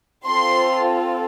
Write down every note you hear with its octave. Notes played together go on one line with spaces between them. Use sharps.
C4 F4 A4 C6